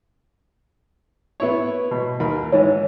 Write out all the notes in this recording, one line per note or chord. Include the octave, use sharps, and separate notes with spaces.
B3 E4 C#5
B2
D#2 A#4 B5
G#2 E3 C#5